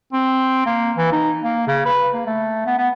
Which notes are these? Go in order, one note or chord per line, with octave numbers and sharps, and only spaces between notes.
C4
A#3
E3
D#4
A#3
C#3
B4
A#3
A3
B3
B3